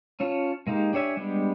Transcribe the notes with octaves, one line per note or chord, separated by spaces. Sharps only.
C#4 F4 C#5 A5
G#3 A#3 D#4 G4
D4 G4 C#5 E5 G#5
G3 G#3 B3 D4 G4